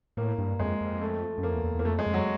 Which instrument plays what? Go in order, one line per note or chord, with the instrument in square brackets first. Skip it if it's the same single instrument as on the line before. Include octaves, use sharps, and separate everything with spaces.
[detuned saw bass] A2 [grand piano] A#3
[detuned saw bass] G2
[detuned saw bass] F2 [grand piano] G#3
[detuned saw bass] F2
[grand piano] A3
[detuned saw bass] F#2
[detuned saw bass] F2 [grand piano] A#3
[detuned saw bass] E2
E2
E2
[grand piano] A#3
[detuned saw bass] F2 [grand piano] A3
[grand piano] G#3
[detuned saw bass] F2
[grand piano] F#3